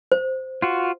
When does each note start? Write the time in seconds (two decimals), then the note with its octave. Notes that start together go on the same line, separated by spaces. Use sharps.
0.12 C5
0.62 F4 F#4